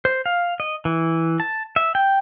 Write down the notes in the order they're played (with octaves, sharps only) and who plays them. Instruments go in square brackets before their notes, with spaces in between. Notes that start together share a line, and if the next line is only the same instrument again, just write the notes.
[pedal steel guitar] C5
F5
D#5
E3
A5
E5
G5